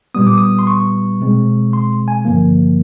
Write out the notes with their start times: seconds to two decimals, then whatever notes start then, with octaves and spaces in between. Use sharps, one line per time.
0.15 A#2 G3 B3 D#6
0.27 D6
0.38 D#6
0.59 C6
0.67 C#6
1.21 B2 G#3 C4
1.73 C6
2.08 G#5
2.25 G2 D3 F3 A#3